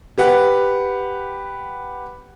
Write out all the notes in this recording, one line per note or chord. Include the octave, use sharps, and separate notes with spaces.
G4 B4 F#5